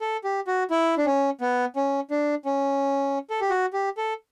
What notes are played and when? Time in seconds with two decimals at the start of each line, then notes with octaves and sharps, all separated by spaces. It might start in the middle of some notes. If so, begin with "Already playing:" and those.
0.01 A4
0.24 G4
0.47 F#4
0.70 E4
0.98 D4
1.06 C#4
1.41 B3
1.76 C#4
2.10 D4
2.45 C#4
3.30 A4
3.41 G4
3.50 F#4
3.73 G4
3.97 A4